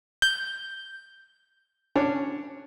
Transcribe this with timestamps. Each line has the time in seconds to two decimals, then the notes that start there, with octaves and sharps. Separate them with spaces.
0.22 G6
1.95 C#4 D4 C#5